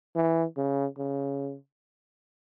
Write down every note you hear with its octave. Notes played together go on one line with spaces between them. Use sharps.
E3
C#3
C#3